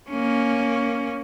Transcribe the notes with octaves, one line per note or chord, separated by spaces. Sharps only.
A#3 C#4